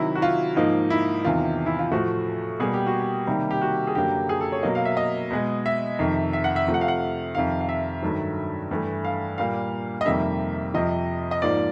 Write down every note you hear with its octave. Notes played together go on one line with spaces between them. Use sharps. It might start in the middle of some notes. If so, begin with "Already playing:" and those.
Already playing: C3 D#3 F#3 E4
F#4
F4
G#2 F3 A#3 D#4
E4
E2 C3 D#3 F4
E4
F4
A2 F3 A3 F#4
B2 G3 A#3 G#4
G4
F#4
G4
C3 D#3 G3 A#3
G4
F#4
G#4
F#2 D3 F#3 A#3 G4
G#4
A4
C#5
B2 F#3 A#3 D#5
F5
E5
D#5
B2 G#3
E5
F2 C3 D#3
E5
F#5
E5
C3 F3 A3
F#5
F5
F#5
F2 C3 D#3 F5
F5
E5
G2 D#3 F#3 A3
G2 E3 A3
F5
A#2 G3 A#3 F5
D#5
F2 C3 D#3 G3 A#3 E5
F2 C3 F3 D#5
D#5
G#2 F3 A#3 D5